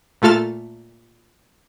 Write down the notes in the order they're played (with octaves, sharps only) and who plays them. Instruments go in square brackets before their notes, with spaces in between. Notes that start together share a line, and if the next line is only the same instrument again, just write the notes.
[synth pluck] A#2 A3 F4 A4 F6 A6